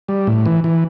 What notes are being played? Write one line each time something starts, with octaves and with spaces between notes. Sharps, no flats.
G3
A2
E3
E3